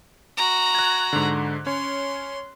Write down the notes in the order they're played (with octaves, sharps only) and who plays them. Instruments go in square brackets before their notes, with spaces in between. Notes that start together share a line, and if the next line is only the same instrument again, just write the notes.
[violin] F#4 A#5
[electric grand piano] F#6 G#6
G#2 D3
[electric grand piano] C#4 C#5 [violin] C6